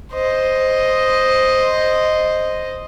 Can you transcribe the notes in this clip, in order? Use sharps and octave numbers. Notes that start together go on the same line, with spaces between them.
C5 D#5